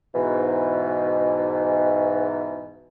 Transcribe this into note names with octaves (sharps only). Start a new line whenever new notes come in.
G#2 B2 E3